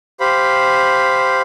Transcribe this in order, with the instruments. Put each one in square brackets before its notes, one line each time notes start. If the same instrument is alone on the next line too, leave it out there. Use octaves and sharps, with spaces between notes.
[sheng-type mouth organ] G4 C5 F5 B5